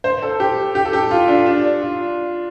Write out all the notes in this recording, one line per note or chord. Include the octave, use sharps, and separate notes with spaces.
C5
A4
G4
G4
A4
G4
F4
D4
D4
F4